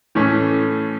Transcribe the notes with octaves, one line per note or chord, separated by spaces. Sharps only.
A2 E3 A3 C#4